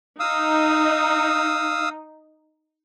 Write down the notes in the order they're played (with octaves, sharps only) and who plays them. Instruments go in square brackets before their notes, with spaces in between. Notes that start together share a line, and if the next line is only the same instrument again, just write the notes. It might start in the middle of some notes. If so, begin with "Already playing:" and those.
[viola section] D#4 [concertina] F5 D#6 E6